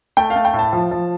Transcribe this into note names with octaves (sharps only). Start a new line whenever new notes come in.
A3 G5
F5
A3
G5
A2
A5
F3
F3